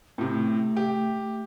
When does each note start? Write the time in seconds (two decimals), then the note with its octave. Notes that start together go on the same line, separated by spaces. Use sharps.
0.18 A2 C3 A3
0.76 G4